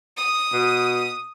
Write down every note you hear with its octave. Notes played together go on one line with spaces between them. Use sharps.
D#6
B2